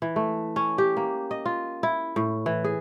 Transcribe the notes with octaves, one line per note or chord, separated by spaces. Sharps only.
E3
A3
C#4
G4
A#3
D#5
F4
E4
A2
E3
G#4